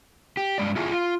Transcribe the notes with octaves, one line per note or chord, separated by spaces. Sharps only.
G4
G2 G#3 D5
E4 F4 G#4
F4